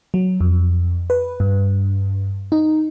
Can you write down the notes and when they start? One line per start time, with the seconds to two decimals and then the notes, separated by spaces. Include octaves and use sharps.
0.14 F#3
0.41 F2
1.10 B4
1.40 G2
2.52 D#4